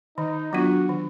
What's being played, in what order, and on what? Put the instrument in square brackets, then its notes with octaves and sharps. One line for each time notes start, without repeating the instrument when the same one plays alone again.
[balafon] D#3 [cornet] D#4
[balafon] F#3 B3 D4 F4 [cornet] F#4
[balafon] D#3